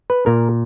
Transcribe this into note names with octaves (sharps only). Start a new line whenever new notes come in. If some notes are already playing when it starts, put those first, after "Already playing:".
B4
A#2 A#4